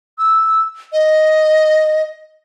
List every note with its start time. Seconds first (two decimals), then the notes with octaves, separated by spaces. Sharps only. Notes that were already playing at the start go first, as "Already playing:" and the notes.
0.19 E6
0.92 D#5